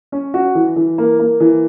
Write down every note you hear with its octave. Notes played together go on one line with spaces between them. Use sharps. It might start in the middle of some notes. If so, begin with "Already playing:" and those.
C#4
F#4
E3
E3
A#3
A#3
E3